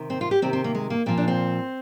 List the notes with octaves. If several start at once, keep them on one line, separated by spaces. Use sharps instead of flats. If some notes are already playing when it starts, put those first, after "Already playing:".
Already playing: C3 D#3
C4
F4
G4
C3 D#3 C4
C4
A#3
G#3
A#3
A#2 F3 C4
D4
C4